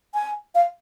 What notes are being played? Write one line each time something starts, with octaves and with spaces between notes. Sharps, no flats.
G#5
F5